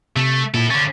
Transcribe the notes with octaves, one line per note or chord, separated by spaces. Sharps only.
C3 A3
A#2 E4 A4
D3 C#4 A6